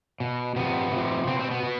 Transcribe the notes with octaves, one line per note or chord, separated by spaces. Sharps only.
B2
C3 F3 B3
C3 F3
B2 C4
C4
B3
B2